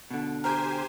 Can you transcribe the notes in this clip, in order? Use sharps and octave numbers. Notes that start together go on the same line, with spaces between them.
B2 D3
G4 A#4 C5 G5 G#5